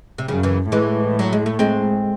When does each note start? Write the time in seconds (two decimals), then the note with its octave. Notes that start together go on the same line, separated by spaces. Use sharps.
0.18 C3
0.28 F#2 C#3
0.43 C#3 E3
0.72 A2 E3 G#3
1.19 F#3
1.33 G#3
1.46 A3
1.59 G#3 C4